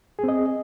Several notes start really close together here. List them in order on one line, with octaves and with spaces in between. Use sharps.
G#4 C4 D#5